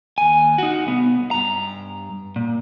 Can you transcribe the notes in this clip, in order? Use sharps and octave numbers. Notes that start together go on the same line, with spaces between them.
D#2 G#5
D#4 F#4
C2 B3
G2 A#5
A#2